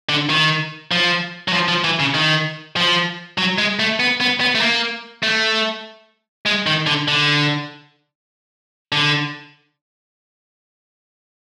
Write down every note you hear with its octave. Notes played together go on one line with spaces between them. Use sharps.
D3
D#3
F3
F#3
F3
F3
E3
C#3
D#3
F3
F#3
G#3
A3
B3
B3
B3
A3
A#3
A3
G#3
D#3
D3
D3
D3